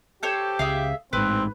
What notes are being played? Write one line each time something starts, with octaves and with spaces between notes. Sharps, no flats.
G4 A4 C5 C#5
C#2 G#4 E5 F5
A1 G#2 C4 B4